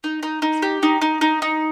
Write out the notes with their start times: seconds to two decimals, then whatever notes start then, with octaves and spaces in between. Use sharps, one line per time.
0.04 D#4
0.23 D#4
0.42 D#4
0.62 G4
0.83 D#4
1.02 D#4
1.21 D#4
1.42 D#4